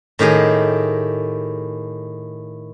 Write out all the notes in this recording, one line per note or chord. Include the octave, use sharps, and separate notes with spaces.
A2 D#3 G4 G#4